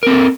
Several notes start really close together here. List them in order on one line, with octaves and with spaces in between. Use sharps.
A#4 C4 A4